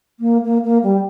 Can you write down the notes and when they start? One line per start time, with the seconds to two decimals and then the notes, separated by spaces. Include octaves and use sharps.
0.20 A#3
0.45 A#3
0.64 A#3
0.83 G3